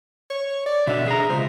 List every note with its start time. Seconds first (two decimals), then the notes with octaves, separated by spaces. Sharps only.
0.30 C#5
0.66 D5
0.87 B2 D3 E5
1.08 G#4 A#5
1.29 C#2 C5